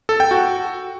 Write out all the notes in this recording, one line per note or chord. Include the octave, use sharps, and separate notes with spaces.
A4
G5
F#4